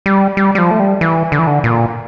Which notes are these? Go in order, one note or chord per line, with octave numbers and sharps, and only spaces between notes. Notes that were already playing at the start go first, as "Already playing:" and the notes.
G3
G3
G3
F3
A3
G3
E3
D3
E3
D3
A#2